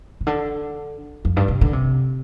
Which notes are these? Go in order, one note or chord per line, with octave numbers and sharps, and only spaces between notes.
C3
D3
F2
G2
C3
D3
C3